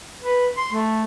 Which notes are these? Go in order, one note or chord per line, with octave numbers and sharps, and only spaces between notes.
B4
C6
A3